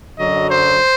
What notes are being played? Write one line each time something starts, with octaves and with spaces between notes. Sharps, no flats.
F#2 D3 F#3 D#5
C5